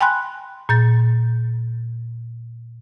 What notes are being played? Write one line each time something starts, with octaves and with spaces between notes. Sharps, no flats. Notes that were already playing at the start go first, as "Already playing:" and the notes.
G5 G#5 B5 C6 F#6
A#2 G6 A6